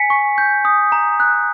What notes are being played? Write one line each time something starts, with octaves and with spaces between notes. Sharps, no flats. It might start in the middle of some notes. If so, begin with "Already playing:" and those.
Already playing: G#5 B6 C#7
C#6
G6
D#6
A#5
F#6